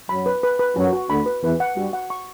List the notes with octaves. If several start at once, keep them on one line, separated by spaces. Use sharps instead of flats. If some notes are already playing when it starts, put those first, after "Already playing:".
F#2 F#3 B5
B4
B4
B4
F#2 F#3 F#4
F#4
D2 D3 B5
B4
E2 E3 B4
F#5
G2 G3 F#4
F#5
C#6